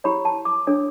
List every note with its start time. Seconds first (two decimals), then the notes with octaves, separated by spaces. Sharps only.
0.04 E4 G4 C#5 B5
0.25 A5
0.45 D6
0.67 D4 A4 C#5